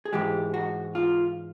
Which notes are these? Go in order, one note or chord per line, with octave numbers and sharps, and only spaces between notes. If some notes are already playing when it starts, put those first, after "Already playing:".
G#4
G#2 E3 G#3 G4
F#4
F4